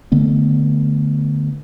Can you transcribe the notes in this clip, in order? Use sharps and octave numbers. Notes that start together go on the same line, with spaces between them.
D3 A3 B3